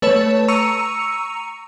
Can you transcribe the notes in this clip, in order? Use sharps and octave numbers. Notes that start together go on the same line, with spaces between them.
A3 B4 C#5 A5 E7
A#5 C#6 E6 C#7 D#7 F7